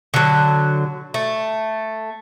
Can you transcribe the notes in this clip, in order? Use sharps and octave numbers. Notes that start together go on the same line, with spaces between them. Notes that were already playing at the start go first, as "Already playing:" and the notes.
D3 F#3
A3